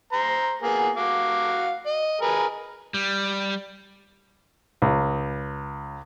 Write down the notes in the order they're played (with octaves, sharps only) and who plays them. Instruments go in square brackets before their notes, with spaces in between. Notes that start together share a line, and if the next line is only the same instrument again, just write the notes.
[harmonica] C5 A#5
A#3 B3 G#4
F#4 F5 D6
D#5
G#4 A#4 B4
[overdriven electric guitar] G3
[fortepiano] C#2